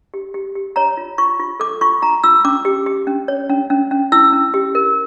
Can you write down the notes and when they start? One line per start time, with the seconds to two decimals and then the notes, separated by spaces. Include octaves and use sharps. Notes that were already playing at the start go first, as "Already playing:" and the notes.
0.14 G4
0.34 G4
0.55 G4
0.76 C#5 A#5
0.97 F4
1.18 F4 C#6
1.40 F4
1.60 A4 D6
1.81 F4 C#6
2.02 F4 A#5
2.24 F4 E6
2.45 C#4 D6
2.65 G4
2.86 G4
3.07 C#4
3.28 C#5
3.49 C#4
3.70 C#4
3.91 C#4
4.12 E4 E6
4.33 C#4
4.54 G4
4.75 A#4